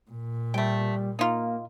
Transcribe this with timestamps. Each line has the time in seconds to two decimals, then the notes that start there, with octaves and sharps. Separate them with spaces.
0.11 A#2
0.54 G3 A3 G5
1.19 A#3 D#4 F4